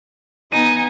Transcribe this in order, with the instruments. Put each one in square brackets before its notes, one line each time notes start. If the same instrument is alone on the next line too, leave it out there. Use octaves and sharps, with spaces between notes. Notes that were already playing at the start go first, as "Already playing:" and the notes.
[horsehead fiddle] B3 G#5 [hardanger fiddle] D#4 [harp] D#7